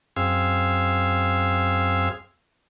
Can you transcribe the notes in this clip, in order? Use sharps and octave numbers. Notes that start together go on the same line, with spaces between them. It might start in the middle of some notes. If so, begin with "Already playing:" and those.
F#2 C4 G#4 F5 E6